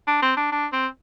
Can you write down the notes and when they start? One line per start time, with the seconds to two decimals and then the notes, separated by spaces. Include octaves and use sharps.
0.07 D4
0.22 C4
0.37 D4
0.52 D4
0.72 C4